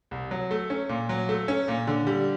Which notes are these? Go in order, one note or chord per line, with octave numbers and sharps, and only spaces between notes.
C2
F#3
A3
C#4
A#2
F#3
A3
C#4
A#2
D3
G3